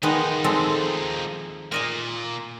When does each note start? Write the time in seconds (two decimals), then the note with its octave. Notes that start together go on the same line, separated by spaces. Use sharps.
0.03 D#3 F3 G#3 B3 D#4
0.44 G#3 C4 A4
1.72 A#2 A#4 D#5 G#5